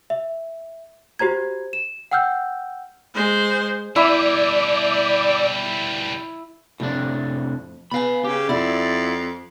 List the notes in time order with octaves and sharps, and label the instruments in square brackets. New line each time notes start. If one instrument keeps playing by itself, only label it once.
[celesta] E5
F#4 G4 C5 A#5 G#6
E7
F#5 G5 E6 F6 G6
[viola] G#3 C5
[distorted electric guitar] B2 G3 [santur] E4 [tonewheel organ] D5 D6
[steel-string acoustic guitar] F2 [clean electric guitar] A2 C3 D4
[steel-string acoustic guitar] B3 B4 G#5 [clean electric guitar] F5 B5
[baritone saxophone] C#3 [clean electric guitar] G4
[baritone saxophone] F2 [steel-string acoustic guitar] E4 F#4 [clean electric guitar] D5